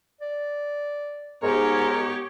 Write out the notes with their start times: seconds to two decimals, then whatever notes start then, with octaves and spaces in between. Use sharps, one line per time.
0.21 D5
1.43 G#2 B3 G4 A#4 C#5